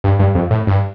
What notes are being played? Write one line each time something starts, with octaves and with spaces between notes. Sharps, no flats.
G2
G2
F2
A2
G2